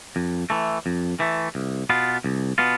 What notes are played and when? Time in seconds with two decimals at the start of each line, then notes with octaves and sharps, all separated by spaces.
0.16 F2
0.50 E3 A3
0.86 F2
1.20 E3 A3
1.55 C2
1.90 B2 B3 F4
2.24 C2
2.58 B2 B3 F4